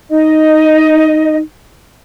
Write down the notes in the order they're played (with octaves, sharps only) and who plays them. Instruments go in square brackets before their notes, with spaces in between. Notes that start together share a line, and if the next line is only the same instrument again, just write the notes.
[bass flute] D#4 [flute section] D#5